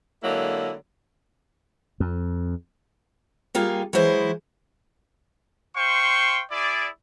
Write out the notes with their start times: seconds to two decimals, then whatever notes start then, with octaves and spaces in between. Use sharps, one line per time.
0.24 D3 F#3 G#3 A#3 E4
2.00 F2
3.55 G3 A#3 F4 G#4
3.93 E3 F#3 G#3 E4 C5 D#5
5.76 C5 F5 G5 C6 C#6
6.51 E4 G#4 D5